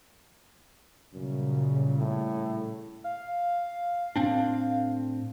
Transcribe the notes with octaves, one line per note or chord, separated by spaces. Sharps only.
F#2 A#2 C#3 G3
A2
F5
A2 C4 D4